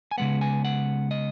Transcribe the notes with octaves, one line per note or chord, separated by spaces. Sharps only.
G#5
C#3 G#3 B3 F#5
G#5
F#5
D#5